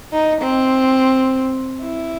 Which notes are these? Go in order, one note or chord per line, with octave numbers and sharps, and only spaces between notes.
D#4
C4
E4